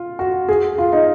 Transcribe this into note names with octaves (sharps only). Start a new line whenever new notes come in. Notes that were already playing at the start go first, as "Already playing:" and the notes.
Already playing: F4
F#4
G#4
F4
D#4